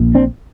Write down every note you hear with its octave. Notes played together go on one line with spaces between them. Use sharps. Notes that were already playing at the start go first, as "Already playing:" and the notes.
Already playing: A#1 A#2
C4 D4